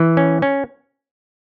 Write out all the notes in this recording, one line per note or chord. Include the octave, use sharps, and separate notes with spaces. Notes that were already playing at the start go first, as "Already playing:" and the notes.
Already playing: E3
C#4
C#4